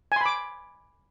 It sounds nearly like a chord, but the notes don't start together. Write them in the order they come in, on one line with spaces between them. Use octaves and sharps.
G#5 C6 B5 D6